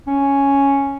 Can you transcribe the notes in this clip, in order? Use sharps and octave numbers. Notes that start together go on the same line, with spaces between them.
C#4